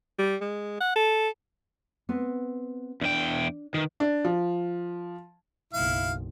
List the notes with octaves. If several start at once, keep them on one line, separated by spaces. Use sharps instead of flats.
G3
G#3
F#5
A4
B3 C4 B4
E2 D4 G5
D#3 B4
D4
F3
F#1 B1 E4 F5